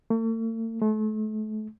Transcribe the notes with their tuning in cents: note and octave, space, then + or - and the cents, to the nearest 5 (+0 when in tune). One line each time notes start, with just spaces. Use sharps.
A3 +45
A3 -35